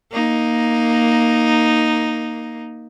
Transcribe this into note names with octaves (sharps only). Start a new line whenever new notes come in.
A#3 D#4